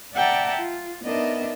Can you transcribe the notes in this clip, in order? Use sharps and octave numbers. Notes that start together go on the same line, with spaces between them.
D5 E5 F#5 G5 A5 A#5
F4
B3 D4 D#4 A#4 D#5 E5